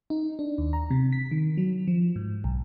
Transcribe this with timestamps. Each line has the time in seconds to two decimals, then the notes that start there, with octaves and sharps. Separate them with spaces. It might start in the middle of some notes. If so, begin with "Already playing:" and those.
0.10 D#4
0.39 D4
0.58 D#2
0.73 A#5
0.91 C3
1.13 B6
1.31 D#3
1.57 F#3
1.87 F3
2.16 G#2
2.44 B1